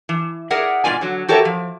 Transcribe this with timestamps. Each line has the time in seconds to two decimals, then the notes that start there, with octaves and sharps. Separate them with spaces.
0.09 E3
0.50 G#4 A#4 D5 E5 F#5
0.84 G#2 B2 A#3 F4 D5 G#5
1.01 D3 F#3
1.28 F#4 G4 A4 A#4 C#5 E5
1.45 F3